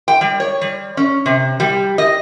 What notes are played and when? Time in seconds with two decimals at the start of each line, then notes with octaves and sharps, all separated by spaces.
0.08 G5
0.21 G3
0.40 C#5
0.61 G3
0.97 C#4
1.26 C3
1.60 G3
1.98 D#5